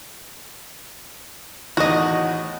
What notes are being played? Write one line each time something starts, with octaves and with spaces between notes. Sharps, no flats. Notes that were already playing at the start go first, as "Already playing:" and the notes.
E2 A2 D#3 F#4 D#5